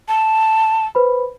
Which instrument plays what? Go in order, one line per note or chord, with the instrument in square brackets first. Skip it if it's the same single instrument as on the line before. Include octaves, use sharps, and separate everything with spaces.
[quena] A5
[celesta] B4 C5 B5